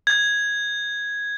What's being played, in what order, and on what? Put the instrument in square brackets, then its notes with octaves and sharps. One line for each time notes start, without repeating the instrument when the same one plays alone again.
[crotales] G#6